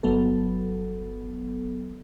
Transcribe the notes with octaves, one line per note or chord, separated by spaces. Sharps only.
G1 F#3 B3 A4